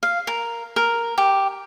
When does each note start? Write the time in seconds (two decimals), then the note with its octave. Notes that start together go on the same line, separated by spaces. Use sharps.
0.03 F5
0.27 A#4
0.76 A#4
1.18 G4